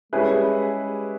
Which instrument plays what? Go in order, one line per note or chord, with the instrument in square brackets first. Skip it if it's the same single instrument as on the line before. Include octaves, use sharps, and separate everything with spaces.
[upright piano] G3 C#4 E4 G#4 B4 [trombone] G#3